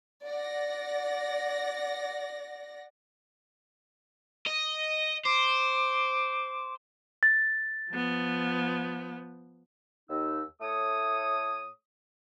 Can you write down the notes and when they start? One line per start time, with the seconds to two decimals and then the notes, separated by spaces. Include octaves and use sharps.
0.24 D5 F#5 A#6
4.47 D#5
5.25 C5 D6
7.23 A6
7.92 F3 B3
10.09 D#2 D#4 E6
10.61 A2 A3 C#5 D#6